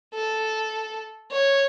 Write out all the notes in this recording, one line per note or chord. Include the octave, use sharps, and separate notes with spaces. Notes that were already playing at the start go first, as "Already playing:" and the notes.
A4
C#5